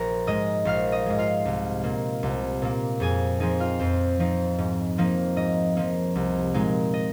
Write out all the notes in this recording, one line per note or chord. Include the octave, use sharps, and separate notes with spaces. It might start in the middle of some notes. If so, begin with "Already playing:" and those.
Already playing: A#1 A#4 A#5
G#2 G#3 D#5 D#6
A#1 F5 F6
D#5 D#6
G#2 G#3
F4 F5
C2
A#2 A#3
C2
A#2 A#3
F2 G#4 G#5
F3 C4 D#4 G#4 G#5
F4 F5
F2 C5
F3 C4 D#4
G#2
F3 A#3 D#4
G#2 D#5
F3 A#3 D#4
C2
A#2 G#3 D#4
D#5